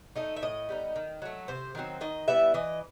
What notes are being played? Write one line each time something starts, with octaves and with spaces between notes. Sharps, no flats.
A3 D#4 D#5
E5
A2 D#5
G3 B3 D#4
D#3
F#3 A3
C3 C5
D#3 F#3 C4
D#3 D#5
G3 B3 E4 E5
E3 D#5